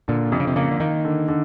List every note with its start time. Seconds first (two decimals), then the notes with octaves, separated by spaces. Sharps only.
0.08 A#2 D3
0.32 F2 C3
0.40 C#3
0.47 C3
0.56 C#3 A#3
0.71 D3
0.80 D#3 A#3
1.05 D3
1.28 D3